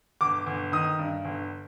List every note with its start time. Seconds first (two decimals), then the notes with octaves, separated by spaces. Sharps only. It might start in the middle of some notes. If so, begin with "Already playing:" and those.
0.21 G1 D6
0.47 G1
0.72 D#3 D#6
0.99 G2
1.25 G1